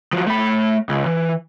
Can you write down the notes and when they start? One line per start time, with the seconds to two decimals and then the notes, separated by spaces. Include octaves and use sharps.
0.13 F3 F#3
0.27 A3 B5
0.89 C#2
1.06 E3